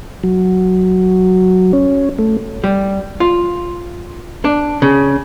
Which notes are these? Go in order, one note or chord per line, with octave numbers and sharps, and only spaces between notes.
F#3
C#4
A3
G3
F4
D4
C#3